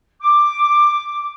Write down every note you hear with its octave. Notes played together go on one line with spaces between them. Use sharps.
D6